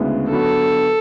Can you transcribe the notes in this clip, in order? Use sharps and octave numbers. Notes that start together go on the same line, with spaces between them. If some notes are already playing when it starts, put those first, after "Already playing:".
Already playing: D2 C#3 G#3 B3 E4
D3 F#3 B3 F#4 A4 B4